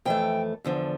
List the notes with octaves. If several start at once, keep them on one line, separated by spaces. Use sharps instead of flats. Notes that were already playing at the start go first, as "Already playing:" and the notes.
F2 E3 A3 G5
E2 D3 F3